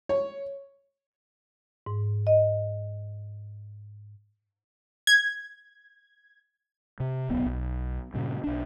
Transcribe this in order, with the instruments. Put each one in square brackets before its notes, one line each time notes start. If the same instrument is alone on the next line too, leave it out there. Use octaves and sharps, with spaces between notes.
[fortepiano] C#5
[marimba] G#2
D#5
[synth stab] G#6
[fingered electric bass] C3
D1 B1 B2 B3
B1
G2 A#2 C#3
B1 D4